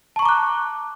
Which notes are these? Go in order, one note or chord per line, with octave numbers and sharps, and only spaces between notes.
A5 A#5 C#6 D6 F#6